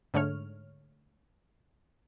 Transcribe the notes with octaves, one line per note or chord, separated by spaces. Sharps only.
G#2 D3 A3 C#5 F6